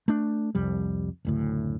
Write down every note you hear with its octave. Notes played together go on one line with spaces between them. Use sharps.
A3 D4
C2 F2 G3
F#1 D2 A2